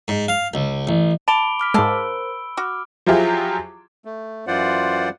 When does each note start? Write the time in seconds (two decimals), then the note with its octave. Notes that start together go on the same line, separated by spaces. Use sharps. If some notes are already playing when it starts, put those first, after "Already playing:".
0.08 G#2
0.28 F5
0.54 C#2
0.87 A1
1.28 A5 B5 D6 D7 G7
1.60 D6 F6 B6
1.74 G#2 G#3 A#4 C5 F5 A5 E6
2.57 F#4 D6 F6
3.06 F3 F#3 E4 F4 G4 G#4
4.05 A3
4.47 F#2 E3 F4 C5 D5 F#5